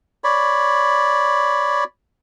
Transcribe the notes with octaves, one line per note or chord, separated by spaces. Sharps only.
C#5 D5 B5